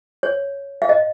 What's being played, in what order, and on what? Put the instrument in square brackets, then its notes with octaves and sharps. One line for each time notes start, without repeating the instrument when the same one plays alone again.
[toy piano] C#5
F5
D#5